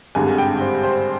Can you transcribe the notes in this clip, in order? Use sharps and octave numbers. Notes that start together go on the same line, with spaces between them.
G#1 G2 D3 G#3 G#5
G5
C5
C5